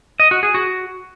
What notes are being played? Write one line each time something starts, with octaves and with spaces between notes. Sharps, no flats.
D#5
F#4
G#4
F#4